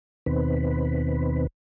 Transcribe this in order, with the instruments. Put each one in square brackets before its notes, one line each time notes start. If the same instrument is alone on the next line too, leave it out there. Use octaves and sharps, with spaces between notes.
[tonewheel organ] D#2 B2 D#3 C4 B4